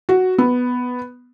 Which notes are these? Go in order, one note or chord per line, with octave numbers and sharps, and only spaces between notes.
F#4
B3